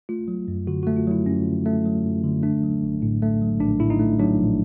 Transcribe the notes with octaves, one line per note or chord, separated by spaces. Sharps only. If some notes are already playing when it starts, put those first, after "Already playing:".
A3 F4
F#3
F#2
D3 F#4
F#4
A3
F4
F#3 E4
F#2 C#4
D3
A3
F#3
F#2
D3
A3 D4
F#3
A#1
A2
A3
F#3
A#1 D4
A2 E4
D#4
A3
F#3 D4
A#1